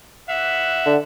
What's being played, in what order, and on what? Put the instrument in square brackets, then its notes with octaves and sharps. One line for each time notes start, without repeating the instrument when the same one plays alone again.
[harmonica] E5 F#5
[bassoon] D3